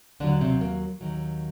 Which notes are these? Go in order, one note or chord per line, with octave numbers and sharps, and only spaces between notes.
D#2 D3 D#3 F#3 D4
C3 C4
A#3
D#2 D#3 F#3